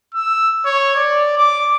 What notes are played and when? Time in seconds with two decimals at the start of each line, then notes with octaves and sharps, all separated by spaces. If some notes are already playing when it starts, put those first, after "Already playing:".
0.14 E6
0.66 C#5
0.96 D5
1.38 D6